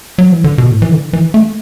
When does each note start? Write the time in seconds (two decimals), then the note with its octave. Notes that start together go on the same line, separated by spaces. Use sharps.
0.18 F#3
0.32 E3
0.44 D3
0.58 B2
0.71 A2
0.82 E3
0.91 D3
1.13 E3
1.34 A3